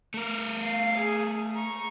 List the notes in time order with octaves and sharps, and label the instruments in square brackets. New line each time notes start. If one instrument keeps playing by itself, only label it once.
[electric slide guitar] A3 A#4
[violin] F5 C7
G#4
A#5 C#6